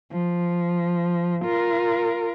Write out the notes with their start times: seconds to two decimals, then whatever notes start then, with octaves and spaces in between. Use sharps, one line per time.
0.12 F3
1.45 F4 A#4